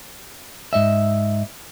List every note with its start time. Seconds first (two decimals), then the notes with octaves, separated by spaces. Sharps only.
0.73 G#2 D#5 E5